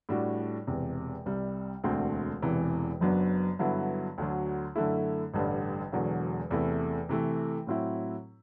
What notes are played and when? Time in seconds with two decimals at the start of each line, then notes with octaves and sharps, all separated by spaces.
0.09 A2 G3 D4 F#4
0.67 E1 E2 C3
1.26 C2 C3 G3
1.84 E1 D2 D3 A3 C4
2.42 E1 E2 C3 E3
3.00 F#1 F#2 F#3 B3 D4
3.59 G2 D3 F#3 B3 E4
4.18 D2 D3 F#3
4.76 F#2 D3 A3 E4
5.34 A1 G2 D3 G3 D4
5.92 E1 E2 D3 F#3
6.51 E2 C3 E3 A3 E4
7.09 C3 E3 A3
7.67 A2 F#3 C4 E4